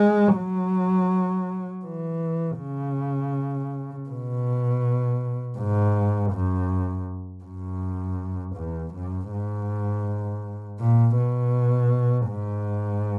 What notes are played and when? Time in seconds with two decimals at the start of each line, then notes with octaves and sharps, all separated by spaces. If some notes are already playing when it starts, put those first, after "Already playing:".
Already playing: G#3
0.36 F#3
1.85 E3
2.60 C#3
4.09 B2
5.58 G#2
6.32 F#2
7.44 F#2
8.56 E2
8.94 F#2
9.31 G#2
10.80 A#2
11.17 B2
12.29 G#2